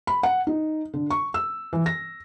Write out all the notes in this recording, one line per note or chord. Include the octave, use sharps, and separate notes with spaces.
B5
F#5
D#4
D3
C#6
E6
E3
A#6